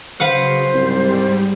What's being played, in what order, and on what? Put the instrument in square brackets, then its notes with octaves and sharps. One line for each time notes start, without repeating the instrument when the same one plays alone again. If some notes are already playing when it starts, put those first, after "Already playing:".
[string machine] C#3 F#3 [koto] B4 F5 F#5 [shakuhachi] C5
[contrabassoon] C2 [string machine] G#2 G3